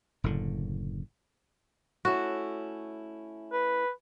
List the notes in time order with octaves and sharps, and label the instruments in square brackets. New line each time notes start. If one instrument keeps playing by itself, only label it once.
[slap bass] F#1 A2 D3
[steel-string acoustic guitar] A3 C#4 E4 [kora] F#4
[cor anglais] B4